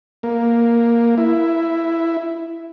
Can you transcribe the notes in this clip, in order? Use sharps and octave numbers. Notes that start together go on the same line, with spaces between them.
A#3
E4